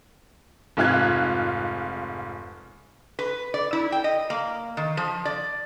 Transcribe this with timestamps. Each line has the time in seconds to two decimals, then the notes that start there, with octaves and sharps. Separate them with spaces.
0.77 F1 G#2 F4 F#6 G#6
3.19 B4
3.54 D5
3.73 E4
3.92 G5
4.04 D#5
4.30 A#3
4.77 D#3
4.97 F3
5.25 D5